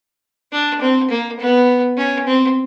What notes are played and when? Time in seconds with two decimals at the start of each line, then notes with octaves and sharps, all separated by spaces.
0.52 D4
0.81 C4
1.10 A#3
1.39 B3
1.97 C#4
2.26 C4